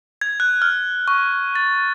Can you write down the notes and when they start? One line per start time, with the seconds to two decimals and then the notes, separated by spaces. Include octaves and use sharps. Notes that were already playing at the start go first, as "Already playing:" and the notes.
0.21 G#6
0.40 F#6
0.62 F6
1.08 C#6
1.55 A6